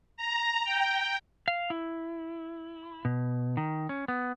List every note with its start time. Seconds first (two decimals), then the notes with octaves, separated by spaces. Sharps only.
0.17 A#5
0.64 G5
1.48 F5
1.70 E4
3.05 B2
3.57 D#3
3.89 C#4
4.08 B3